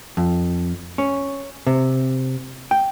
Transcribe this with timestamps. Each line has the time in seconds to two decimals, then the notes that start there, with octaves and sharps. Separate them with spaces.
0.17 F2
0.98 C#4
1.67 C3
2.71 G5